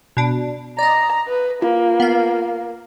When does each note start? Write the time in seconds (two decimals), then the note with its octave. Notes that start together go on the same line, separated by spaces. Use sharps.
0.17 B2 D4
0.79 D5 D#5 A#5
1.28 B4
1.62 A#3 F4
2.00 B3 F5